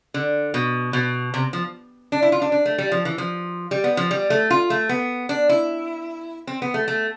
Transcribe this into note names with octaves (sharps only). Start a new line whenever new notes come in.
D3
B2
B2
C3
F3
D4
E4
F4
D4
D4
A3
G3
F3
E3
F3
G3
B3
F3
G3
A3
F4
A3
B3
D4
E4
C4
B3
A3
A3